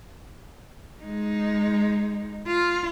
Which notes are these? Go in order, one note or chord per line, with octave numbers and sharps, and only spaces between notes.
G#3 D#4
F4